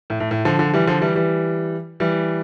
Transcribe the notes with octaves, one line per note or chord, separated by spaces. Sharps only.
A2
A2
A2
D3 F3
D3 F3
E3 G3
D3 F3
E3 G3
E3 G3
E3 G3